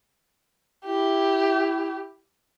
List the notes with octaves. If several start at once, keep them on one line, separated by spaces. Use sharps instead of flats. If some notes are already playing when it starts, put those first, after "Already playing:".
E4 G4